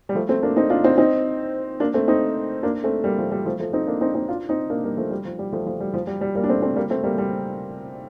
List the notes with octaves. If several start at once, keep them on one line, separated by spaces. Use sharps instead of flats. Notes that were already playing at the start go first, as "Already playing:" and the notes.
G3
F3 A3
A3 C4
A#3 D4
C4 D#4
D4 F4
C4 D#4
C4 D#4
A#3 D4
A3 C4
C4 D#4
A#3 D4
A3 C4
G3 A#3
F3 A3
G3
F3 A3
F3 A3
C4 D#4
A#3 D4
C4 D#4
C4 D#4
D4 F4
C4 D#4
A#3 D4
G3 A#3
F3 A3
G3
F3
G3
F3 A3
F3
G3
F3
G3
G3
G3 A#3
D4
A3 C4
A3 C4
G3 A#3
A3 C4
G3 A#3
G3